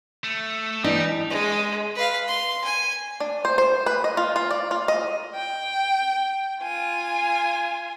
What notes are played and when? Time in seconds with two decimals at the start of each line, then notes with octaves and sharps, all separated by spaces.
0.24 A3
0.84 E3 G3 D4 D#4
1.30 G#3
1.96 B4 F5
2.28 C6
2.64 G#5
3.20 D4
3.45 C5
3.58 C5
3.86 B4
4.04 D#5
4.17 F4
4.36 F4
4.51 D5
4.71 F4
4.88 D#5
5.35 G5
6.62 F4 G#5